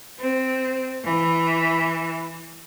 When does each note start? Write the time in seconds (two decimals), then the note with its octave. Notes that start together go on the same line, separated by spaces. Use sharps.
0.20 C4
1.05 E3